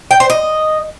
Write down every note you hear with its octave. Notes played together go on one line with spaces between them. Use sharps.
G5
C5
D#5